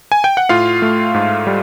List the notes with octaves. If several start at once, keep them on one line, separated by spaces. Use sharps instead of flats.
G#5
G5
F#5
A2 F4 F5
A3
G#2
G3